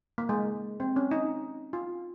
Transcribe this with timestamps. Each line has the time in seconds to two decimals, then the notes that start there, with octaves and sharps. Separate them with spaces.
0.18 A#3
0.29 G#3
0.80 C4
0.96 C#4
1.11 D#4
1.73 F4